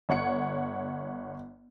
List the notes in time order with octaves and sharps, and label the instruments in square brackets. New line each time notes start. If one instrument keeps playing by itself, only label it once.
[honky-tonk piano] G1 C#5 F#5 C#7